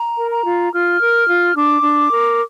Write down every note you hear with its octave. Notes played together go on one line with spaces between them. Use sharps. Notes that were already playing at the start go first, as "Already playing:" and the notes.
Already playing: A#5
A#4
A#5
F4
F4 F6
A#4
F4
D4 D6
D4
A#4